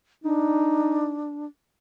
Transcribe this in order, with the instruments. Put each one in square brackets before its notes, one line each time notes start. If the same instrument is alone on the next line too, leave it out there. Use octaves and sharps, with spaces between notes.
[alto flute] D4 [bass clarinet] D#4